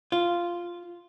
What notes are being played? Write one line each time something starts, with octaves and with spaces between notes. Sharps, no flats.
F4